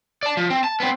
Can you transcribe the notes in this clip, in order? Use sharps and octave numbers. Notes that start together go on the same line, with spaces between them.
D5 A5
F3
C4
A5
B3 C4